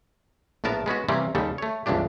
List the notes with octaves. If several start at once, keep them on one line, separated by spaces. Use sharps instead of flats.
A#1 A2 B3 A#4 A5
G#3 B3 C#4 F#4
C3 E3 G3 A#3 C4 C#4
D#2 C#3 G3 A4
A3 C#5
G1 C#2 E3 F3 D4 G4